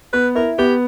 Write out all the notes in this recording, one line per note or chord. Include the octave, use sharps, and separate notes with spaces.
B3 B4
E4 A#4
B3 G4